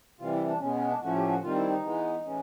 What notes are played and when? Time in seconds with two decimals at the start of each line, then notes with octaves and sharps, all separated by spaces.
0.19 C3 E3 G3 F4
0.33 E4
0.47 D4
0.60 B2 G#3 B3 C#4
0.74 C#4
0.87 D4
1.01 A2 F3 A3 C#4 F#4
1.15 G4
1.28 F#4
1.42 D#3 G3 C4 F4
1.55 E4
1.69 D#4
1.83 E3 G#3 B3
2.24 A2 E3 G#3 C#4